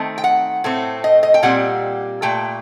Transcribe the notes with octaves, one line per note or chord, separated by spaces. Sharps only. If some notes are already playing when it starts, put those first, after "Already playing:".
Already playing: D#3 A3 C4
G5
F#5
A2 A3 C4
D#5
D#5
G5
A#2 G3 C4 F#5
A#2 A3 G5